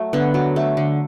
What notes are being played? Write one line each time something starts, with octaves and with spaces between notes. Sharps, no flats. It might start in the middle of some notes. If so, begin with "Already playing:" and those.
Already playing: F#3 A3
D3 B3
F#3
A3
D3